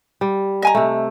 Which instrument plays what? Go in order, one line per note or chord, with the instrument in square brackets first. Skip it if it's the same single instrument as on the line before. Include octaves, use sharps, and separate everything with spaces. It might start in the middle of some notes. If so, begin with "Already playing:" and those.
[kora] G3
[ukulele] D#5 G#5 A#5
[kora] C3 A3